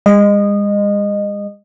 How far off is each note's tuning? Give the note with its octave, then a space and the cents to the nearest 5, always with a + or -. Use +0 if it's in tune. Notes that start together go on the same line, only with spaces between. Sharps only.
G#3 -40 D#5 -20